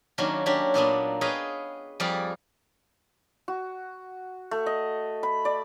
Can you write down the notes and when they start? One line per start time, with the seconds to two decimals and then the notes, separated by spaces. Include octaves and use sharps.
0.18 D#3 F#3 A#3 C#4 D4
0.46 F#3 C#4 D4 G4
0.74 A#2 A#3 B3 D4
1.21 G#4 B4 C#5 D#5 F5 G5
2.00 F2 G3 G4 G#4 D5 F5
3.48 F#4
4.51 A3
4.66 D#5
5.23 B5
5.45 D5